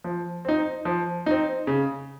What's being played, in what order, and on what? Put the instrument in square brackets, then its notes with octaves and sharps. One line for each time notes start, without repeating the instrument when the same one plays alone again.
[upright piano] F3
C4 D#4
F3
C4 D#4
C#3